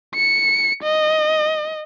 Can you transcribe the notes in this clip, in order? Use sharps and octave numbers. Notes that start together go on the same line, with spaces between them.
C#7
D#5